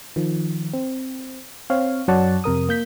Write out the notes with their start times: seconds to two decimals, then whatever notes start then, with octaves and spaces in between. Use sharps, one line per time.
0.16 D#3 F3
0.74 C4
1.70 C4 C#5 F5
2.08 F#2 F#3 C#5 D5 F#5 A5
2.44 F2 C3 A#4 D#6
2.69 A#3 G6 B6